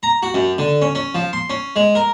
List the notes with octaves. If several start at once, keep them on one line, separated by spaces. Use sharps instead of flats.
A#5
F#4
F#2
D3
C#4
C#4
F3
C6
C#4
G#3
A#4